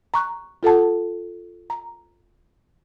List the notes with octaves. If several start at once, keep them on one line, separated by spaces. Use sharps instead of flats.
A#5 C#6 F#6
F4 A4 F#5 A5
A#5